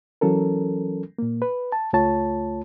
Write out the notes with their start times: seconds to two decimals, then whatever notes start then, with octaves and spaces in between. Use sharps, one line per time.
0.21 E3 F#3 C#4 A4 A#4
1.18 A#2 A#3
1.42 B4
1.72 A5
1.93 C#2 A3 F4 C#5 A5